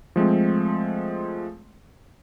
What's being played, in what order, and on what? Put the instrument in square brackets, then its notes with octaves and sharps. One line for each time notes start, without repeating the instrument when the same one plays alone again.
[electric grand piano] F3 G#3 A3 C4